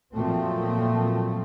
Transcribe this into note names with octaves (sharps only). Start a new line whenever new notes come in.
A#2 F3 F#3 A3 C4